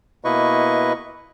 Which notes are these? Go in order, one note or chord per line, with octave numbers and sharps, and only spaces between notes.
B2 A#3 E4 B4 D#5 C#6